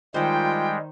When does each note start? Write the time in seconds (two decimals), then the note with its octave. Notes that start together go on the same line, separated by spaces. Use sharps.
0.14 D#3 G3 G#3 F4 C5 G5